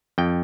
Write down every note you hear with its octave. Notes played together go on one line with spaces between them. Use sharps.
F2 G5